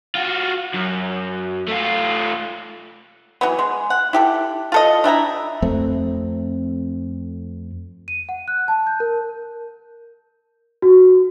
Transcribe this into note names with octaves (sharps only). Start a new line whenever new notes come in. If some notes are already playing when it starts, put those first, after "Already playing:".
F4 F#4
F#2
A3 F4
E3 F#3 B3
G#3
F#5
E4 G4 A4
F4 A4 D#5
D4 E4 G5 A#5
F2 A3 C4
D#7
F#5
F#6
A5
G6
A#4
F#4